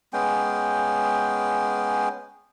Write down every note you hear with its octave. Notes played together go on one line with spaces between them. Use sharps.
G#3 B3 C#4 G5